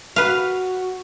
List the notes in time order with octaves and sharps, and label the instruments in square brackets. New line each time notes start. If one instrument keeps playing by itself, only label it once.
[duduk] F#4 [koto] B4 F5